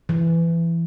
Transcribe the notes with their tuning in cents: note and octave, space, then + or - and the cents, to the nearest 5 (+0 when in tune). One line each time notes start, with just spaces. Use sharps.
E3 +20